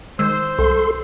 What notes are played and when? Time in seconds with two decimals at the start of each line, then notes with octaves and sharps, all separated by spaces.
0.19 D#3 G#3 C5 E6
0.58 C2 A4 C6